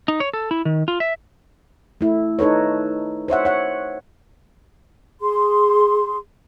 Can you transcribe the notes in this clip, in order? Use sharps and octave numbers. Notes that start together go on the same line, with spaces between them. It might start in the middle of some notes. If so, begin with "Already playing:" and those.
D#4
C#5
A4
E4
D#3
F4
E5
A3 E4
D#4 A4 B4 C#5
C5 C#5 E5 F#5
C#5 F#5
G#4 C6